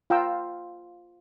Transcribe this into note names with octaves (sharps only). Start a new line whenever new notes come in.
F4 G5 A#5 E6